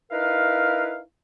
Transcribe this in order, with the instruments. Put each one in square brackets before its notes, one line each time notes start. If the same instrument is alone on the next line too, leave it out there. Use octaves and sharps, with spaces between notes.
[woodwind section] D#4 E4 A#4 B4 F5